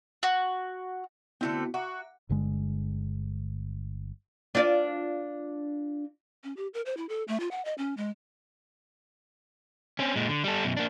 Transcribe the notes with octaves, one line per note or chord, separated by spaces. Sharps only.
F#4
D3 A3 B3 C4 E4 F#4
F#4 E5 A#5 D6
G1 G2 D3 G#3
D4 F4 D5
C#4
G4
A#4
C5
E4
A4
A3
F4
F#5
D#5
C#4
G#3
C4 C#4
A#2 G#3
D3
G3 A4
F#2 B2
A#3 D4